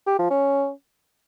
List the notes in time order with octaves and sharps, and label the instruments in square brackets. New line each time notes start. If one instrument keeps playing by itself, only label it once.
[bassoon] G4
F3
C#4